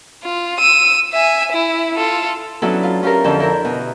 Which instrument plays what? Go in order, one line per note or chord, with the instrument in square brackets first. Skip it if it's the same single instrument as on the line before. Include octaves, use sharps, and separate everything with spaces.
[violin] F4
E6 D#7
E5 G#5
E4
F4 A4
[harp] F#3 B3 C#4 D4 E4 A4
F4
C#4 F4 G4 A4 A#4
F2 D3 A4 G6
E4 A#4
B2